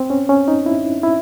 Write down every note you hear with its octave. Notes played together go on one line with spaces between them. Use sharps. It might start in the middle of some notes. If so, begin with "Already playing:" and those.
Already playing: C4
C#4
C#4
D#4
E4
E4